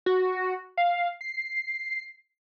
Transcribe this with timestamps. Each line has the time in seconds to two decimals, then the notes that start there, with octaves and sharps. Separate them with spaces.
0.06 F#4
0.77 F5
1.21 C7